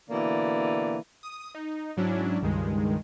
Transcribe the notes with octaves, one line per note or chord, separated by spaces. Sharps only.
B2 D3 E3 A#3 D5
D#6
D#4
G#2 F#3 C#4 D4 E4
C#2 G2 D#3 G#3